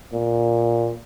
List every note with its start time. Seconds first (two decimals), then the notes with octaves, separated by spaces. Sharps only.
0.13 A#2